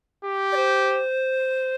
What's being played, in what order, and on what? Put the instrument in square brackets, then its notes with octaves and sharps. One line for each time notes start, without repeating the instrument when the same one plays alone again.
[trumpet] G4
[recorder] D5
C5